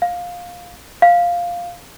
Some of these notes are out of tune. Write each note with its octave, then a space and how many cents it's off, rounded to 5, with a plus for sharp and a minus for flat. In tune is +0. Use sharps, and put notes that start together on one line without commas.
F5 +15
F5 +0